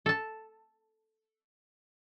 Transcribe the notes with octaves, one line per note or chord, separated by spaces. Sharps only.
A4 A5